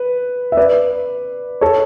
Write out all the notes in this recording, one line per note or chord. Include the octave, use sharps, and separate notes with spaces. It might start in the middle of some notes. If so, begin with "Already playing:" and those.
Already playing: B4
E5
B4 D5
A4 C#5